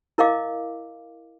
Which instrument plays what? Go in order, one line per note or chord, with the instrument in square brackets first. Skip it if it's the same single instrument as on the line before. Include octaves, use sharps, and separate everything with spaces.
[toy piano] E4 A#4 D#5 F5 D6